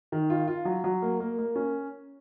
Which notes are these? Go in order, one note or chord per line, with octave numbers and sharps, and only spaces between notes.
D#3
F4
F4
F#3
F#3
A#3
A#3
A#3
C#4